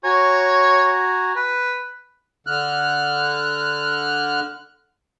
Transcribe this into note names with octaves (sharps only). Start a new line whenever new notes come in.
F#4 C#5 G#5 A#5
B4
D3 F6 F#6